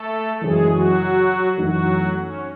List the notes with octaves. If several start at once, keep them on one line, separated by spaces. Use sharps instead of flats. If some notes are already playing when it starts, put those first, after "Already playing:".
Already playing: A3 A4
F#2 C#3 E3 G#3 G#4
F#3 F#4
F#2 E3 F#3 A3 D#4 F#4
C#4